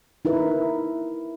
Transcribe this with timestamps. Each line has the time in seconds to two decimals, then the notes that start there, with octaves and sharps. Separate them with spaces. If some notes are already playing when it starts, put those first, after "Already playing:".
0.25 D#4 E4 A#4 B4